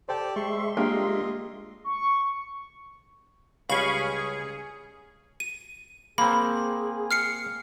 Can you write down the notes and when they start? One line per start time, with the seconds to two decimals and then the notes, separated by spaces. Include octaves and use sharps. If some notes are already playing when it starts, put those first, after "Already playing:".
0.09 G4 A4 C5 D5 G5
0.36 G#3 E5 C6 C#6
0.77 A#3 D4 F4 G4 D#5
1.84 C#6
3.69 C#2 G3 C#4 G#4 F5 B5 C#6
5.40 D#7
6.18 A#3 C4 G#4 B5
7.11 F6 C7 C#7